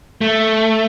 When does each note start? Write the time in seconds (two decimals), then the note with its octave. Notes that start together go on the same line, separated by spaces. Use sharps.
0.21 A3